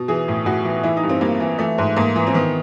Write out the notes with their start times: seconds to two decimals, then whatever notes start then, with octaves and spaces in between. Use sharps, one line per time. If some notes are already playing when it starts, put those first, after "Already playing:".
Already playing: B2
0.08 E3 G#4
0.28 A2
0.46 A2 F#4
0.65 E3
0.83 E3 E4
0.97 D#4
1.03 G2
1.09 C4
1.21 G2 A#3
1.40 E3
1.59 E3 A3
1.78 G#2
1.96 G#2 A#3
2.16 E3
2.27 C4
2.34 D#3 B3